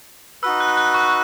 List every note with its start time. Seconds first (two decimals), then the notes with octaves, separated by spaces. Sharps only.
0.43 D#4 F#4 B4 E6
0.60 F#6
0.77 F#6
0.94 C#6